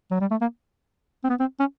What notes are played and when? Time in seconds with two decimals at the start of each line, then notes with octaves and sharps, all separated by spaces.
0.11 F#3
0.20 G3
0.31 A3
0.41 A#3
1.24 C4
1.29 B3
1.39 C4
1.59 C#4